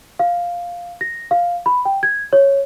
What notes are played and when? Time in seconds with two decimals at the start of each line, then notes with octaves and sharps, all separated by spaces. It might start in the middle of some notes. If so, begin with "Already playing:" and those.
0.19 F5
1.01 A#6
1.31 F5
1.66 B5
1.85 G5
2.03 G#6
2.33 C#5